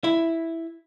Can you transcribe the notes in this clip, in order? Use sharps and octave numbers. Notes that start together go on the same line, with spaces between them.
E4